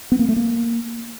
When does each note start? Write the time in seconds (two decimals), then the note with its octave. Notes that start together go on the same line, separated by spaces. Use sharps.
0.12 B3
0.19 A#3
0.29 A3
0.37 A#3